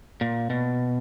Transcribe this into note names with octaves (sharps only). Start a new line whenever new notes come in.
A#2
B2